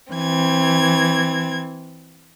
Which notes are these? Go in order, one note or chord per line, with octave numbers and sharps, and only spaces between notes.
E3 C4 G#6